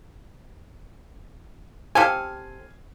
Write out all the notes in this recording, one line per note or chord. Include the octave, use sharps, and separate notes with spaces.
C4 G4 A4 F5 G#5